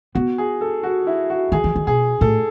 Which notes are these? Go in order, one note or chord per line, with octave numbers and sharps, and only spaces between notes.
B3 F#4
G#4
A4
F#4
E4
F#4
D#3 G#4
E3
D#3
B2 G#4
A2 A4